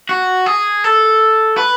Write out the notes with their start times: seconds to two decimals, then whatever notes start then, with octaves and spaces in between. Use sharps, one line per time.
0.09 F#4
0.46 G#4
0.84 A4
1.57 B4